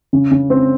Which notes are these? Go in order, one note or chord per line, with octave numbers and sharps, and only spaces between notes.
C#3
C#3
C4